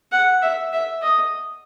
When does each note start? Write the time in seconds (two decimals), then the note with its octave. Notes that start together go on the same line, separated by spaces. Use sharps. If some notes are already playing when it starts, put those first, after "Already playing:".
0.12 F#5
0.42 E5
0.73 E5
1.02 D#5